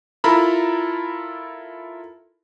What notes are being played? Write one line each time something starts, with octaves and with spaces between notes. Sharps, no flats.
E4 F4 A4 A#4 A#5 B5